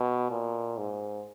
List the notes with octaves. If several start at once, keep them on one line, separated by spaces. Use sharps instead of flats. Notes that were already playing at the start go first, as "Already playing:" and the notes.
Already playing: B2
A#2
G#2